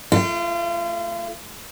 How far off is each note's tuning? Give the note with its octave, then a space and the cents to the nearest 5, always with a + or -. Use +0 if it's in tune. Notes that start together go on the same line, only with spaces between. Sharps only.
A3 -5 F4 -35